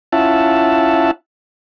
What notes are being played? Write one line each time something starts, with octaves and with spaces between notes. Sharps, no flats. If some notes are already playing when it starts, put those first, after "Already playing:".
C#4 E4 F4 E5 F#5 A5